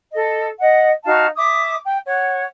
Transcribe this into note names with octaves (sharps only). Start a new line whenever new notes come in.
A4 D#5
D#5 F#5
D#4 F#4 F5 A5
E5 D6 D#6
G5
C#5 F#5